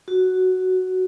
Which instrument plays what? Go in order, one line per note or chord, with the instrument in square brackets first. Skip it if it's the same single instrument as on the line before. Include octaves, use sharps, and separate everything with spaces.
[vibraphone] F#4